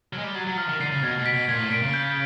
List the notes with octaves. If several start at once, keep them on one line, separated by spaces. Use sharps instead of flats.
F#3 F6
G#3
G3
F#3 A6 C7 D#7
F#3
F3 F6
D#3
D3 A6 C7 D#7
C#3
B2 G#6
B2
B6 D7
B2
A#2 G#6
A2
A#2 B6 D7
C#3
G6